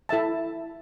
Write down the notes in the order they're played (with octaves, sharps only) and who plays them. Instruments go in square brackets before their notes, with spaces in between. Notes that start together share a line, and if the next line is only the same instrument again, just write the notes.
[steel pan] E4 A4 E5 A5